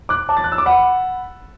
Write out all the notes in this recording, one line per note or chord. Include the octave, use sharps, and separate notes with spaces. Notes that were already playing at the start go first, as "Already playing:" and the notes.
D6 F#6
A5 D6
A6
F#6
E6
D6
F#5 B5